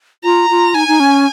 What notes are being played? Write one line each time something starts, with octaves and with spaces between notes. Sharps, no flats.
F4 A#5
F4
D#4 G#5
D#4
C#4